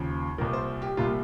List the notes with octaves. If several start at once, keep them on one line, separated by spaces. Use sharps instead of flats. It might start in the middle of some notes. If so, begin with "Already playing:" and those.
Already playing: D#2 C#3 F3
C2 A#2 F3 A#4
C5
G4
C2 A#2 G3 F4